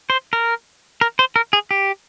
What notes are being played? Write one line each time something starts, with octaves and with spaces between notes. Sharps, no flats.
C5
A#4
A#4
C5
A#4
G#4
G4